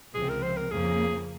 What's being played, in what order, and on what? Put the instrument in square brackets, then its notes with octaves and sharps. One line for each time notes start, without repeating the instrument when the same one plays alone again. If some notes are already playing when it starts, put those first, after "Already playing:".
[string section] C#2 C3 F3 C4 [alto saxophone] G#4
[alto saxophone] A#4
C5
A#4
[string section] F2 C#3 F3 A#3 [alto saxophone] G#4